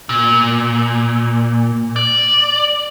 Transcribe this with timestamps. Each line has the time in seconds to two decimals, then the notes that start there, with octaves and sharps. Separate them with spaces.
0.09 A#2
1.96 D5